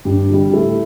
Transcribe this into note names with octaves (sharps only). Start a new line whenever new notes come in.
G2 G4
D3 G3
G4
A2 E4 A4